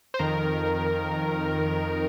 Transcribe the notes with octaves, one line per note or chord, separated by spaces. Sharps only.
C5
F2 D#3 A#4